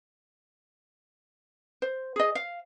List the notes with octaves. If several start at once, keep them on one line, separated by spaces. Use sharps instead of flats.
C5
G#4 D#5
F5